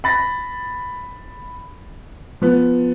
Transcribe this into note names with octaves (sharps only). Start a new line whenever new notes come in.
B5 A6 A#6
F3 B3